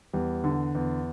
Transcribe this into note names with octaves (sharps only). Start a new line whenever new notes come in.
E2 G3
D3
E2